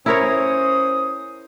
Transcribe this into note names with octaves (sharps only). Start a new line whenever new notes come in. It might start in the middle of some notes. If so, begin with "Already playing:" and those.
C#4 E4 A#4 C5 C#5 D#6